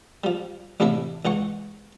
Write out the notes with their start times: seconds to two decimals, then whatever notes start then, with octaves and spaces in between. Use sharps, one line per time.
0.24 F3 G3
0.80 A1 A2 C3 D4 E4 E5
1.25 C#2 E3 F#5 C#6